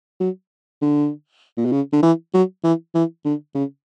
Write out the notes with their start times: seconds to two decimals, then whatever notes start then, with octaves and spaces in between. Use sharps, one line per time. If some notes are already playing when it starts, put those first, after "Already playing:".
0.20 F#3
0.81 D3
1.57 A#2
1.65 B2
1.72 C#3
1.92 D3
2.03 E3
2.34 F#3
2.64 E3
2.94 E3
3.24 D3
3.54 C#3